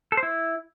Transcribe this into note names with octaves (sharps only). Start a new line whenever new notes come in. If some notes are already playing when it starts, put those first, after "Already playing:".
A4
C5
E4